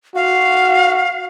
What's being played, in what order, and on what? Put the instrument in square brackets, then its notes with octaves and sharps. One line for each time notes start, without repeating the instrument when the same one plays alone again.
[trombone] F#4 [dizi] F5